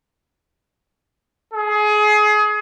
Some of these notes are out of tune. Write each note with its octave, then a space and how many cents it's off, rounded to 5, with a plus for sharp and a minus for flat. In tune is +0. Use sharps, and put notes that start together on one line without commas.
G#4 +25